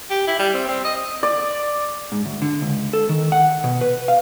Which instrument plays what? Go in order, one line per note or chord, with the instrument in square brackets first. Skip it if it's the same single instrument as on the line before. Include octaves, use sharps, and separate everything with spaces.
[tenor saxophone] G4
E4
G3
C4
C4
D#5
[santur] D5
[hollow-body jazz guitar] G#2
D2
D3
C#2
A4
D#3
F#5
B2
B4
F5